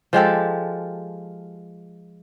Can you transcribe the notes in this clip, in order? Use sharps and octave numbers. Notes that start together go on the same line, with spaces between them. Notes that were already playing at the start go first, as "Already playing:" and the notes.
F3 G#3 G4 A4